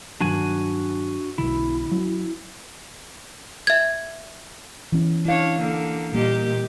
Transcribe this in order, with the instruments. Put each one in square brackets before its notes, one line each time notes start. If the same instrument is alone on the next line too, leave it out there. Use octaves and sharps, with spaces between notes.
[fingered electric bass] G2 D#3 F#3 [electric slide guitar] D4 F#4 G#5
[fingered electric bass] B1 B2 D3 [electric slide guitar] E4
[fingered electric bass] F#3 C#4
[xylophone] E5 G#6
[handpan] E3 C#4
[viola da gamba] D4 C#5 [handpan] E4 F5
[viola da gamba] D3 A#3
[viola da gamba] A#2 G4 D#5 [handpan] G3 A#3